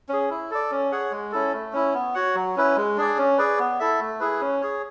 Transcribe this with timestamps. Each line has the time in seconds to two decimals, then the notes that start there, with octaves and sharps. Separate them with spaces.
0.09 C#4 G#4
0.30 E4
0.51 A4 D5
0.71 C#4
0.92 G#4 C#5 F#5
1.11 G#3
1.32 C#4 E4 A4
1.53 A3
1.73 C#4 E4
1.94 B3
2.14 F#4 C#5 F#5
2.35 F#3
2.56 C#4 E4 B4
2.77 G#3
2.97 D4 G#4 D5
3.18 C#4
3.38 G#4 B4 D5
3.59 B3
3.80 E4 A4 E5
4.00 A3
4.20 E4 G#4 B4
4.41 C#4
4.61 G#4 C#5